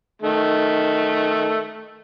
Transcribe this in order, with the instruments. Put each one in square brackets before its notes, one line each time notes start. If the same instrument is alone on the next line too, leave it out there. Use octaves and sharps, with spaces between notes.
[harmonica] D#3 A3